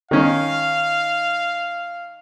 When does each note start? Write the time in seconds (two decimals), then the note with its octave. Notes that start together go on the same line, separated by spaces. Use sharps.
0.11 D#3 C#4 D#4 F5